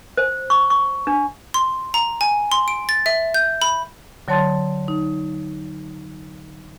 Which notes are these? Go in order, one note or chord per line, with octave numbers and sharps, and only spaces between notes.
C5
C#6
C#6
D4
C6
A#5
G#5
C6
D7
A6
E5
G6
B5
D3 F#3 C#5 A5 C6 A6
D#4